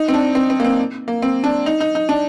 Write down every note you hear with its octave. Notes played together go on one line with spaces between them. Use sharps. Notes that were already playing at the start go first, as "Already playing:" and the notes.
Already playing: D#4
C4
D4
C4
C4
A#3
C4
A#3
C4
D4
D#4
D#4
D#4
D4